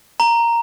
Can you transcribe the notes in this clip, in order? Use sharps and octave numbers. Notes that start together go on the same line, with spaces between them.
A#5